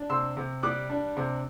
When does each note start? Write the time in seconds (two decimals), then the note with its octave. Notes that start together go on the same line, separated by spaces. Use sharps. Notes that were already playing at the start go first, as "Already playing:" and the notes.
Already playing: D4
0.10 C3 C6 E6
0.37 C3
0.63 G3 D6 F#6
0.90 D4
1.17 C3